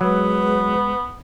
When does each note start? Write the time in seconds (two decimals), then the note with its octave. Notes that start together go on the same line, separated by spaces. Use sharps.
0.01 F#3 G#3 B3 B4